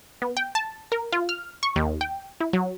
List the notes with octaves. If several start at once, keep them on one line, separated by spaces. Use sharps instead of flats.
B3
G5
A5
A#4
F4
F6
C#6
D#2
G5
E4
F#3